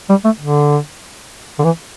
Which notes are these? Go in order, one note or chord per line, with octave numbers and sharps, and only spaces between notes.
G3
A3
D3
D3
E3